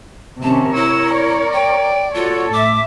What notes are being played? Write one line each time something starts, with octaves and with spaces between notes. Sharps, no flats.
C3 D#3 C#4 A5
E4 A#4 C#5 E6
D5
G5
F4 F#4 A4 C#5
A2 E5 D6